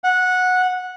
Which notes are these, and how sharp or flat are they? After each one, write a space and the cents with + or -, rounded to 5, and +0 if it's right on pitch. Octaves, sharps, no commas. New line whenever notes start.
F#5 -15